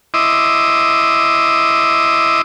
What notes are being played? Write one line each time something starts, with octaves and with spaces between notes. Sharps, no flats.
E4 D#5 E5 C6 D6 D#6